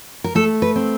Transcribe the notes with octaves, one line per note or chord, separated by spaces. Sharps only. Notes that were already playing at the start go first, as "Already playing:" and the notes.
A#4
A3 A4
B4
C4